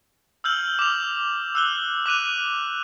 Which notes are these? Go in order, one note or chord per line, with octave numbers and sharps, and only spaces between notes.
E6 F6 G6 F#7
D6 F7
E6 F#6 G7
D6 F#6 D#7 F7